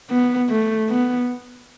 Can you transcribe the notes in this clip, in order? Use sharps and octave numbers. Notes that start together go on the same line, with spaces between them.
B3
A3
B3